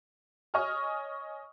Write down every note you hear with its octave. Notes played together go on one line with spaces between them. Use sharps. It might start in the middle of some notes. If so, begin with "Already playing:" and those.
C#5 D#5 G#5 C#6 D#6 F6